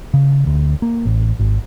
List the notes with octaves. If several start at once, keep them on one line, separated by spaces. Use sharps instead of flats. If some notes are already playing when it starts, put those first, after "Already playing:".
C#3
D2
A#3
A1
G#1